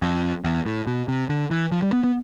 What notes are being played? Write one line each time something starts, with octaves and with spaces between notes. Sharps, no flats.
F2
E2
A2
B2
C3
D3
E3
F3
G3
B3
B3